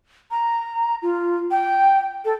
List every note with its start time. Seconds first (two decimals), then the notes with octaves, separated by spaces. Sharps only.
0.31 A#5
1.02 F4
1.51 G5
2.25 A4